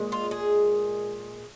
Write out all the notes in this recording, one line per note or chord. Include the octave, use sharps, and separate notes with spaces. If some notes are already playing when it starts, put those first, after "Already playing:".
Already playing: A#2 G#3
F4
G#4